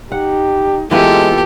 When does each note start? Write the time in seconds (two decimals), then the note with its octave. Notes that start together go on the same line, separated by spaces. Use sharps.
0.12 D#4 G4 F#5
0.91 E3 G#3 A#3 B3 F4 G4 A4